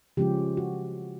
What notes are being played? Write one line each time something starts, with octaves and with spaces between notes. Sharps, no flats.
C#3 F3 G#3 C#4 F4 G4
F#4